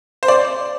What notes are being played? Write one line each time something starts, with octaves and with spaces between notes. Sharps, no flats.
C5
D5